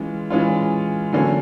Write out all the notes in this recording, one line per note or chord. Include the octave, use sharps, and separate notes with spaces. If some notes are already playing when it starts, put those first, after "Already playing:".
Already playing: E3 G#3 C#4 F4
E3 G#3 C#4 F4
D3 F#3 A#3 C#4